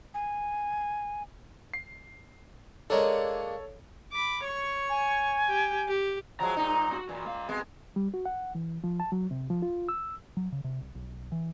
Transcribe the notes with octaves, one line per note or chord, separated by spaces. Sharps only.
G#5
C7
G#3 A#3 D4 A4 C#5
B5 D6
C#5 C#6
G#5
G4 G5
G4
F3 F#3 G#3 A#5
G2 A#2 D#4
F#4
A#2 E3 F#4
G#3 F5
C3 G#3 B3
G3
F#4
F#5
E3
F3
A5
F#3
C3
F3
F4
E6
F#3
C#3
C3
C2
B1
E3